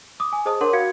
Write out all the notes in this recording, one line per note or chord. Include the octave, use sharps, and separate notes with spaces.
D6 D#6
G#5
G#4 C5 D#5 A5 D#6
D4 A#4 C#5 F#5 C6 D6
F#4 F5 G#6 C#7